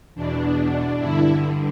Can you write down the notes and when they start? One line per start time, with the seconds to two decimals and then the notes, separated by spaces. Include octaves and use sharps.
0.15 E2 B2 D4
0.99 G2 D3 E4